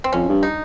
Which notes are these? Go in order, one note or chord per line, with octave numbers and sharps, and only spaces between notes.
C4
F2 C#4
G2
D#4